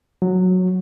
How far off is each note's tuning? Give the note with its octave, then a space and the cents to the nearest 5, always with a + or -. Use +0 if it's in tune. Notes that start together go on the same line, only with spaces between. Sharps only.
F#3 -10